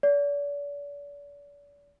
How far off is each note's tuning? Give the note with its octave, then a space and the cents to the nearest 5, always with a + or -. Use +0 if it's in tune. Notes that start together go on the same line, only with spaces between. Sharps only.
D5 -40